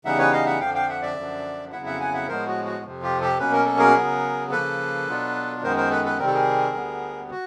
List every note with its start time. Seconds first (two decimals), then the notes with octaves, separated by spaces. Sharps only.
0.05 C#3 E3 G3 B3 D#4 E5 F#5
0.18 B4 C#5
0.32 D#5 F5
0.46 E5 F#5
0.60 F2 D3 F3 F5 G5
0.75 F5 G5
0.89 E5 F#5
1.02 D5 E5
1.16 F#2 D3 F3
1.72 F2 C#3 F#3 B3 E4 E5 F#5
1.86 E5 F#5
2.00 F#5 G#5
2.14 E5 F#5
2.28 A2 F3 G#3 B3 A#4 C5
2.47 F#4
2.65 F#4
2.84 F2 C3 F3
3.02 F4 G4
3.21 G4 A4
3.39 B2 F#3 A#3 C#4 B4
3.52 A#4
3.65 A4
3.78 G#4 A#4
3.96 C#3 F#3 B3
4.51 C#3 F3 A#3 A4 B4
5.07 B2 F#3 B3 D4 F4
5.63 F#2 D#3 G#3 B3 A#4 C5
5.76 A#4 C5
5.90 A4 B4
6.04 A4 B4
6.18 C3 D#3 G3 C4 A#4
6.27 A4
6.33 G#4 A#4
6.75 D2 D3 G3 B3
7.31 F#4